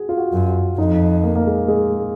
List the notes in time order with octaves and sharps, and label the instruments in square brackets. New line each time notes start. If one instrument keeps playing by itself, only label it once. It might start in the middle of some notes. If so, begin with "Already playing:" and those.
Already playing: [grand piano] F#4 G#4
F4
F#4
[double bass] F#2
[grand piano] F#4
[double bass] F2 [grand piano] D#4
[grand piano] A#3
A#3
G#3
G#3